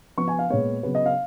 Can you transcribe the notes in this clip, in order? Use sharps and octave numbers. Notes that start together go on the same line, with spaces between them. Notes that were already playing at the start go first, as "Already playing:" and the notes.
F3 B3 C#6
G#5
F5
A#2 G#3 B3 C#5
C#3 F#3 B3 B4
D#5
F5